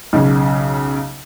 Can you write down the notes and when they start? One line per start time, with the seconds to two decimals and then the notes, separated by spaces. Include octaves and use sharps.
0.13 B1 C#3 G#4